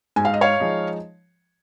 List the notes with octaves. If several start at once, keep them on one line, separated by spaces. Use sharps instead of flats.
G#2 G#5
F5
D#5
C#5 F5
F3 G#3 D#4